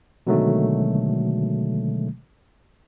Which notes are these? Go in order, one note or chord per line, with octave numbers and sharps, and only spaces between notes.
B2 D3 D#3 F#3 G#3 A3